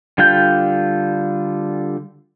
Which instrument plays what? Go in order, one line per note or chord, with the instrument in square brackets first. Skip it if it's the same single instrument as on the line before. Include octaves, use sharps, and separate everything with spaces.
[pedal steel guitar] D3 G3 F4 G5 G6